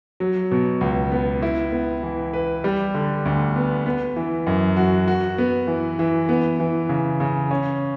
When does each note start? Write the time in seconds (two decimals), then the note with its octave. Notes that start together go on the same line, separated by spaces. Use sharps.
0.20 F#3
0.51 B2
0.81 C#2
1.12 B3
1.42 E4
1.72 B3
2.03 E3
2.33 B4
2.64 G3
2.94 D3
3.25 D2
3.56 B3
3.86 B3
4.16 E3
4.47 F#2
4.76 F#4
5.08 F#4
5.38 B3
5.68 E3
5.99 E3
6.29 B3
6.60 E3
6.89 C#3
7.20 C#3
7.51 C#4